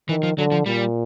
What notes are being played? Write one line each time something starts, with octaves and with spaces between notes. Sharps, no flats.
D#3 E3
F3
D3 F#3
F3
A#2 G3